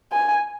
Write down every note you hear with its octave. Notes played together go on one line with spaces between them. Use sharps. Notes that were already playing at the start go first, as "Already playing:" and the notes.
G#5